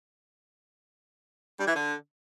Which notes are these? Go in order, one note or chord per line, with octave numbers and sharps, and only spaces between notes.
G3
E3
D3